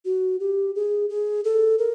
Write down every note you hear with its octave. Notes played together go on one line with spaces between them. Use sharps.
F#4
G4
G#4
G#4
A4
A#4